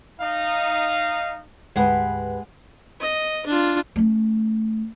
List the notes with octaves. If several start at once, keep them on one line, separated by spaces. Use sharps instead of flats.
D#4 F5
D2 G#2 G#3 G4 B4 F#5
D#5
D4 F4
A3 C#4